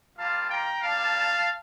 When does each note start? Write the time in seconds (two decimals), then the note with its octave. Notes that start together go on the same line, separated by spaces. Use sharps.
0.16 G3 A#3 F4 F5 A5
0.49 G5 A#5
0.80 G3 A#3 D4 F5 A5